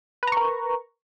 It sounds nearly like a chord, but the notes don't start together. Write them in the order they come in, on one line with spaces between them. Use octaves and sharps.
B4 A#5 C#6 A#4